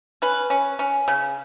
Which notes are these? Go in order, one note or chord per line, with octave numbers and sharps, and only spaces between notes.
C#4 B4
C#4
C#4
C#3